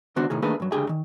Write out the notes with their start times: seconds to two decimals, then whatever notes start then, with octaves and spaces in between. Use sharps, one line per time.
0.16 C#2 D#3 B3 D4 F#4 C5
0.30 A2 C3 D#3 G#4
0.42 D#3 A3 A#3 D4 G#4 B4
0.60 G2 F#3
0.72 C#2 D3 G4 G#4 G#5
0.89 D#3